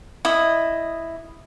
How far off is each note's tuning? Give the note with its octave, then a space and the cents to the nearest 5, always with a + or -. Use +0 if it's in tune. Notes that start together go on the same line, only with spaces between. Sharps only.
E4 +0 D#5 -5